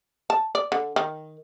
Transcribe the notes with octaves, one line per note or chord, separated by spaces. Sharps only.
A5
D5
D3
D#3